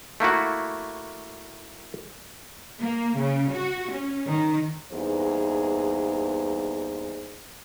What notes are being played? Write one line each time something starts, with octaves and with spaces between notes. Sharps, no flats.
A3 A#3 E4 F#4
A#3
C#3
F#4
C#4
D#3
E2 G2 A#3 D#4 G#4 C5